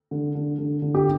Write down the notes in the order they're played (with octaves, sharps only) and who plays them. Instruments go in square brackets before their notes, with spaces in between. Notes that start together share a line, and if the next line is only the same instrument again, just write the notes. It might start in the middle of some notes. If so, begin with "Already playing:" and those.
[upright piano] D3
D3
D3
D3
[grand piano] G4